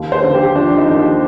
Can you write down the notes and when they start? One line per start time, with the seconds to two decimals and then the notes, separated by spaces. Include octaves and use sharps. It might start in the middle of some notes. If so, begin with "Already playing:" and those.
Already playing: D#2
0.12 C5
0.24 D3
0.34 G4
0.55 F3 D4
0.77 D#4
0.89 D#2